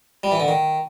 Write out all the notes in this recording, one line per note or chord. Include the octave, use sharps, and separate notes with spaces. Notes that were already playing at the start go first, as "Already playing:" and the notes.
G3
E3
D3
D#3